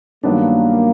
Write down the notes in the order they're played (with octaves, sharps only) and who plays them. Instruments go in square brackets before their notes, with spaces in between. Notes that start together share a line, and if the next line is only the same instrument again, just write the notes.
[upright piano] G2 D#3 F#3 B3 D4 [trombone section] A#3